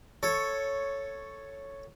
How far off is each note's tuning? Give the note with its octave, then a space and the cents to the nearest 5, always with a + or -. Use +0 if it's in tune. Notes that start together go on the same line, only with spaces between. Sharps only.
A4 +0 C#5 +0